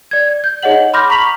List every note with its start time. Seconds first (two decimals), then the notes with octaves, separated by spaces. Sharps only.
0.11 D5 G#6
0.44 G6
0.63 D#4 G#4 C#5 D#5 F#5 F#7
0.94 B5 C6 D6 F6 G6 A#6
1.09 A#5 C#6 B6 F7 F#7